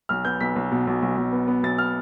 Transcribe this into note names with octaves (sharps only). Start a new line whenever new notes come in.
B1 F6
B3 G6
B1 B6
B1
B2
B1
B1
B1
B3
B3
B1 A6
F6